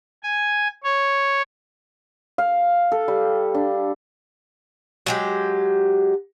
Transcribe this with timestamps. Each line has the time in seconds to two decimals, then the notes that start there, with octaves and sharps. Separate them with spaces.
0.23 G#5
0.84 C#5
2.38 F5
2.92 A4
3.08 G3
3.54 D4
5.06 F#3 G#3 G4